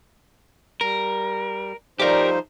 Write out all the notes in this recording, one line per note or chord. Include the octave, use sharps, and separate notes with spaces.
G3 A#4
F3 G3 A3 D#4 G4 A#4 C5 F5